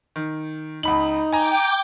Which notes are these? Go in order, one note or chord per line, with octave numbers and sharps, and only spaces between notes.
D#3
C#2 D#4 B5 F#7
G5 G#5 A#5 D6 G6